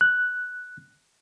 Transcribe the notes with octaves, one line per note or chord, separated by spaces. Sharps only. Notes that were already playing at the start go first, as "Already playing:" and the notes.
F#6